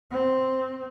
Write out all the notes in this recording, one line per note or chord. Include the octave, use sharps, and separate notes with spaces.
C4